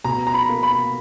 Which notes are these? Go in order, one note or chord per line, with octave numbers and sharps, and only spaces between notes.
B2 A#5
A#5
B5
A#3
B5